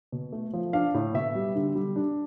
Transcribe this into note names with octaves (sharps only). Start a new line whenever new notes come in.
B2
A3
F3
D4 F5
A2
B2 E5
G3
D3
G3
D4